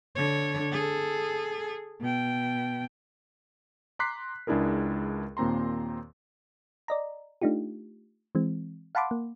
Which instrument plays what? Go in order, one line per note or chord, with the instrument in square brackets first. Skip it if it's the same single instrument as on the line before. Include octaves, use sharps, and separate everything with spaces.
[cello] D3 C#5
G#4 A4
B2 G5
[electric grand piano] A#5 C6 D6 F#6 B6 C7
C#2 G#3 D4 E4 G#4 A#4
D#2 A#2 C4 A#5 C6
[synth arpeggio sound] D5 D#5 A#5
A3 D4 D#4 F4 G4
E3 G#3 C4
F5 F#5 A5 B5 C6 D6
A#3